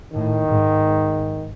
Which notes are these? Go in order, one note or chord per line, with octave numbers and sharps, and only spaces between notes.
A2 D#3
G#2